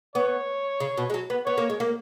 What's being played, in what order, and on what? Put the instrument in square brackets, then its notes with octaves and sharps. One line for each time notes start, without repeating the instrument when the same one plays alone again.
[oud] B3 [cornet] C#5
[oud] C#3
B2
G#3
F#3
B3
[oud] B3 [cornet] C#5
[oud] A#3
G#3
A#3